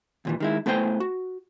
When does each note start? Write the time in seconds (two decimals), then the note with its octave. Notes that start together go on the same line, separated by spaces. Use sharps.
0.25 D#2 A#2 E3
0.40 D#3 G#3 E4
0.66 A3 B3 E4 C5 G5 G#5
1.00 F#4